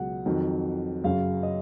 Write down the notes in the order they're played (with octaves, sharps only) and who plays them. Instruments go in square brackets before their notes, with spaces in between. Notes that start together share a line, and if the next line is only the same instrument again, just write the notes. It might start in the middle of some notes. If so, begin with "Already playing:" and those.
Already playing: [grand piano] C#2 B2 F#3 F#5
F2 D#3 F#3
F#2 C#3 F#3 F5
D#5